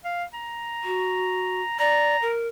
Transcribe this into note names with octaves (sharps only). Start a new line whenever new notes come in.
F5
A#5
F#4
D5 A#5
A#4